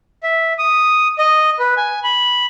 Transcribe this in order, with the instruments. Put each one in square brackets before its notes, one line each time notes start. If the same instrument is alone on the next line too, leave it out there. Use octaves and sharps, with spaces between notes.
[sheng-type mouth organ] E5
D#6
D#5
B4
G#5
B5